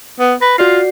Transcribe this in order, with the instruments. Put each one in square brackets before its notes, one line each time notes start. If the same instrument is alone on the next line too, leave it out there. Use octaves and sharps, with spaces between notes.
[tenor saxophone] B3
[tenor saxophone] B4 [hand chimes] A#6
[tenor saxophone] F4 [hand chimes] F#4 D5 C7